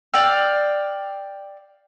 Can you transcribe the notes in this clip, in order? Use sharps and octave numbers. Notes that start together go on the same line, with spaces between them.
D5 F5 G5 E6